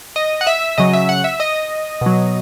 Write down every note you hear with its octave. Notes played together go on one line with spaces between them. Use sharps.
D#5
F#5
E5
C#3 F#3 D#5
E5
F#5
E5
D#5
B2 F#3